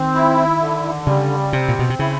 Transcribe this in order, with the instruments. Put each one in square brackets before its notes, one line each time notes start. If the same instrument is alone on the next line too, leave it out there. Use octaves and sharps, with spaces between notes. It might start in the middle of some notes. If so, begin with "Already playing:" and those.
Already playing: [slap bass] D#3 [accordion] C4
[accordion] E4
D3
[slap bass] C#3 [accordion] G3
[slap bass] C3 [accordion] C4
[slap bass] A#2
B2
C3
[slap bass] C#3 [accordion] E4